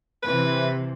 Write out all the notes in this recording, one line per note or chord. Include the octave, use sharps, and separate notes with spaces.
C3 E3 B4